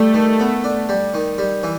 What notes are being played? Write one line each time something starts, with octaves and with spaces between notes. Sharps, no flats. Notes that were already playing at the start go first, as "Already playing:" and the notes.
Already playing: G3 A3
D#3
B3
D4
G3
D#3
G3
E3